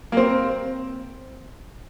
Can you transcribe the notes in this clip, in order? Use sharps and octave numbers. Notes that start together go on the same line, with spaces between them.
A#3
C4